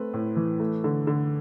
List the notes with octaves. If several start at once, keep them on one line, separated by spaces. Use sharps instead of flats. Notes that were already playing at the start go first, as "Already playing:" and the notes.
Already playing: A3 C4 B4
A2
E3
A3
D3
D3